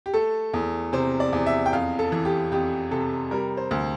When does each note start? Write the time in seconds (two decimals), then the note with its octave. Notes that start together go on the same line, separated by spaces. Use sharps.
0.06 G4
0.14 A3 A4
0.53 E2
0.93 C3 C5
1.20 D5
1.33 E2
1.46 E5
1.66 G5
1.73 F2 F5
1.99 A4
2.12 E3
2.25 G4
2.52 F2 G4
2.91 C3 A4
3.31 G3 A#4
3.57 C5
3.71 D2